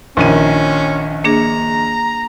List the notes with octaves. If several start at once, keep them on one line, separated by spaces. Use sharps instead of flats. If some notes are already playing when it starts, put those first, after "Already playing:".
A#1 D#3 C#4 D#7
A#3 D4 G#4 A#5